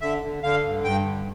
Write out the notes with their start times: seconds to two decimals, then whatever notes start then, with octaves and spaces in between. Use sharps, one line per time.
0.01 D3 E5
0.23 D3
0.43 D3 F5
0.64 G2
0.84 G2 G5
1.05 D3